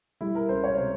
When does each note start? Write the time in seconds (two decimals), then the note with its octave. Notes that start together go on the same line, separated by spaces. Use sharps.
0.21 G3 E4
0.35 A#4
0.49 C#2 C5
0.64 C#5
0.78 C3 C5